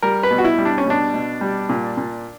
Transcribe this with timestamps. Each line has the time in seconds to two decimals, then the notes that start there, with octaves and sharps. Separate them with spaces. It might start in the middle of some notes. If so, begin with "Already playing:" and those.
0.02 G3 A#4
0.23 B4
0.31 B2
0.38 F#4
0.45 E4
0.58 G3
0.65 D4
0.78 C#4
0.86 B2 D4
1.14 B2
1.41 G3
1.69 A#2
1.97 A#2